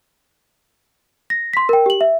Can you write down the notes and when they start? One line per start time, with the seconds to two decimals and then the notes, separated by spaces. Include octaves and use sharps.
1.30 A#6
1.53 C6 B6
1.69 A#4 G5
1.86 G4 F#7
2.01 E5